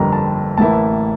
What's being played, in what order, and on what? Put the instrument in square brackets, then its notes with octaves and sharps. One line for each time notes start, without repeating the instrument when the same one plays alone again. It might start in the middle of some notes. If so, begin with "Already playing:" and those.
Already playing: [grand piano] G1 F2 D3 G3 A#3 A#5
A5
A1 A2 E3 A#3 E4 A5